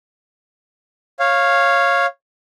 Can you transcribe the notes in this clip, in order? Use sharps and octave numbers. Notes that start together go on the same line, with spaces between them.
C#5 F5